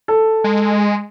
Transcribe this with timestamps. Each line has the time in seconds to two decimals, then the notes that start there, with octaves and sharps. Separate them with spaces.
0.08 A4
0.44 G#3